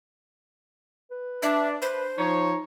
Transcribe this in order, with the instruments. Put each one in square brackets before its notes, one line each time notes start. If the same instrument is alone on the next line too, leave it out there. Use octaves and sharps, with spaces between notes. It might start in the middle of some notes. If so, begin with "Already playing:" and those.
[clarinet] B4
[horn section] D4 [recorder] E5
[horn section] B4 [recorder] C5
[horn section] F3 C#5 [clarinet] D#4